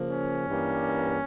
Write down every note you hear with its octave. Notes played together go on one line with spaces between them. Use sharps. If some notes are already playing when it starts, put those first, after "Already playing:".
Already playing: C#3 F3 A#3
C#4
G2 E3 G3 A#3